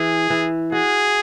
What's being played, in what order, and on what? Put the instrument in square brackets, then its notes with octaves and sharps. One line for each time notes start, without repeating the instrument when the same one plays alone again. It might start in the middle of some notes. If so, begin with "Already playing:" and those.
Already playing: [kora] E3 [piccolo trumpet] G#4
[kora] E3
[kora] F#4 [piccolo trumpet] G#4